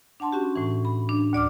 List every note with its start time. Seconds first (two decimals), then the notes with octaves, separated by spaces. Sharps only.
0.20 D4 F#5 A5 C6
0.32 C#4 F#4 G4
0.56 A2 E3
0.85 B5
1.09 D4
1.33 D2 D5 D6 F6